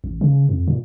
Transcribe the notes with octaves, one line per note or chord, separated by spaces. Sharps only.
A1
C#3
F2
A#2